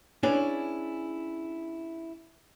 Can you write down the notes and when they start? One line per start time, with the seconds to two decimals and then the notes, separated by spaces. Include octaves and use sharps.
0.23 C#4 D4 E4 G#4 B4